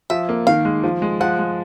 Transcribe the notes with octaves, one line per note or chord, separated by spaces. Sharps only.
F3 E5
A#3
D#3 F5
G#3
F3
G#3
F3 F#5
G#3